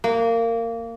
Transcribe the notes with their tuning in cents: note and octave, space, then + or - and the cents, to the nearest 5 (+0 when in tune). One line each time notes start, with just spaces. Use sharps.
A#3 -20